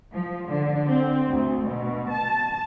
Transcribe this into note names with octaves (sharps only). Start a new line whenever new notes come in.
F3
D3
C4
D2
B2
A5